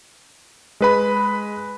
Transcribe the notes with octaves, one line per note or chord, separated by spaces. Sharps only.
G#3 B4 B5